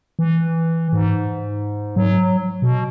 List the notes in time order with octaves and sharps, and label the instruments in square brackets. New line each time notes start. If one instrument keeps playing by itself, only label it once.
[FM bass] E3
G#2
F#3
B2